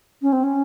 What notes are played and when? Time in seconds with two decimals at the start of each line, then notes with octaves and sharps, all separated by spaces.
0.22 C#4
0.33 C4
0.44 C#4